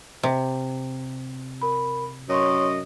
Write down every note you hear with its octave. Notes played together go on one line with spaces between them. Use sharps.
C3
A#4 B5
F#2 C#5 D#5 C6 C#6